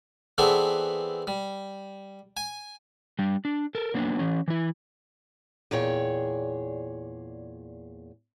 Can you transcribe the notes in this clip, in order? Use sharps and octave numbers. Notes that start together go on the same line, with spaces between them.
E3 B3 C4 G#4 A4 D5
G3
G#5
G3 D4
D4
A4 A#4
F#3 A#3 B3 D4
E3 C#4
E3 E4
E2 A#2 G#4 C#5 G5